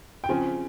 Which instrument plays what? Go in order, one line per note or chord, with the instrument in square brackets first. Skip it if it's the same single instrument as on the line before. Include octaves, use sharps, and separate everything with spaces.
[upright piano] G5
[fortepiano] C#3 F3 C4 [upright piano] G#5